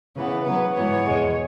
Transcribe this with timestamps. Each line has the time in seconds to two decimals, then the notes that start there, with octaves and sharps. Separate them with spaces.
0.15 C#3 E3 B3 B4
0.45 C#3 F#3 B3 B4
0.76 G#2 E3 B3 C#5
1.07 E2 B2 G#3